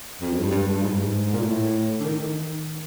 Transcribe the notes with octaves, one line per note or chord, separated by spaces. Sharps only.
F2
F#2
G2
G2
G2
G2
G#2
G2
G#2
A#2
A2
D3
D#3
D#3